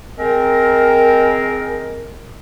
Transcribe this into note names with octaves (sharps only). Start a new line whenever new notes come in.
G#3 C4 A#4